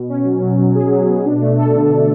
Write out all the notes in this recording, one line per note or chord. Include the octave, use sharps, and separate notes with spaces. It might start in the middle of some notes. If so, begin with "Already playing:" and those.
Already playing: B2
C#4
F#3
F#3
F#3
G#4
F#3
B2
D4
A3
A4
D3
D3